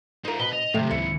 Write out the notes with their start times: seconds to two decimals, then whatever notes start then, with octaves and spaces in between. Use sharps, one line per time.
0.25 D#4 F4 A#4 C5
0.39 B2 B4 G7
0.53 D#5 F7
0.74 D#2 G#2 C3 A3
0.91 C#2 E4 C#7